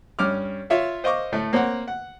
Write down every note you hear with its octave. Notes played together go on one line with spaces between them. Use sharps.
G2 C#4 D6 F6
F4 C#5 E5 F5
C5 D#5 F5 C#6 D6
A2 A3
A#3 C4 C#5 F#5
F#5